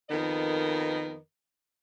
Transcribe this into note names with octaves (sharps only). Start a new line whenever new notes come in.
F2 D#3 B3 A#4 B4 D#5